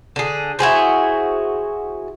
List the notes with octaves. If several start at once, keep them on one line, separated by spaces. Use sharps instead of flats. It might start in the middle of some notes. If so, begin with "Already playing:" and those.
D3 G#4
E4 F#4 G#4 C5